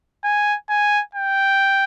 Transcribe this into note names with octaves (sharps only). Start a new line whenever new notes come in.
G#5
G#5
G5